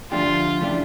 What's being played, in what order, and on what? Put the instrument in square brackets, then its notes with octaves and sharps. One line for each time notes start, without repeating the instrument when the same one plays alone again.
[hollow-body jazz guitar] D3 F3 A3 D4 G4 [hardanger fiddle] F4
[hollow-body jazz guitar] C#3 E3 A3 D4 G4